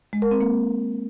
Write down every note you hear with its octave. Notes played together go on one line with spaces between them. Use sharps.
G#3
A#4
C4
A#3